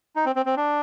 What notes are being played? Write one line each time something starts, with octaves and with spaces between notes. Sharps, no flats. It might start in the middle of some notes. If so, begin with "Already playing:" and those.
D#4
C4
C4
C4
D4